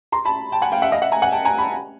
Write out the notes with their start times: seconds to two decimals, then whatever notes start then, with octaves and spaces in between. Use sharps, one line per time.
0.12 A#5 C6
0.25 A5 B5
0.52 G5 A5
0.62 F#5 G#5
0.72 F5 G5
0.82 E5 F#5
0.92 D#5 F5
1.02 E5 F#5
1.12 G#5 A#5
1.22 F#5 G#5
1.32 G5 A5
1.45 G#5 A#5
1.58 A5 B5